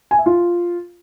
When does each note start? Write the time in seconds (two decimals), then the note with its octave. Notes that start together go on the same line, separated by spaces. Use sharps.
0.11 G#5
0.18 E5
0.26 F4